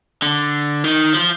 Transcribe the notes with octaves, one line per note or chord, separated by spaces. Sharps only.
D3
D#3
F3